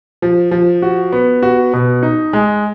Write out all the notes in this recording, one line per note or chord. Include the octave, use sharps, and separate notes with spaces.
F3
F3
F#4
B3
F#4
B2
D#4
G#3